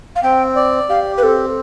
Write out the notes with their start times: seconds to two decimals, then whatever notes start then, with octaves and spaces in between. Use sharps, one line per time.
0.16 F5
0.23 C4 G5
0.56 D5
0.90 G4 F5
1.18 B4
1.23 C4 A4